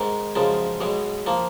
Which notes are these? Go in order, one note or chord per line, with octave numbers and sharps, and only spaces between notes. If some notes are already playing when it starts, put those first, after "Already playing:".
Already playing: G#2 D#3 G#3
F#2 C#3 F3 G#3
B1 B2 G#3
F3 A#3